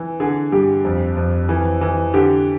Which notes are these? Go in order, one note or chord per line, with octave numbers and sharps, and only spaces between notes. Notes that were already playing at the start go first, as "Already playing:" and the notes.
Already playing: E3
D3 G#4
G2 G4
F2
F2
E3
E3
D3 G4